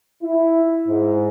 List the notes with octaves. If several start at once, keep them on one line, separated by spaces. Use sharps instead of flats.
E4
G#2